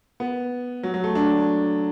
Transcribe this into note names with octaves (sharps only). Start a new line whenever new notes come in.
B3
F#3
F#3
A3
D4